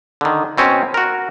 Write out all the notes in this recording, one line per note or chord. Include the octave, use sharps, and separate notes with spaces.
D3 D#3
B2 C4 C#4
F#4 A#4